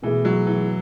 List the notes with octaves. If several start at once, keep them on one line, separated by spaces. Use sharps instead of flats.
B2 E3 A3 E4 G#4
F#3
E3